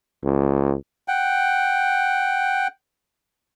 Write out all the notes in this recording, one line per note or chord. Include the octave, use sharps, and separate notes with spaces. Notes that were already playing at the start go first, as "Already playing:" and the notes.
C#2
F#5 G5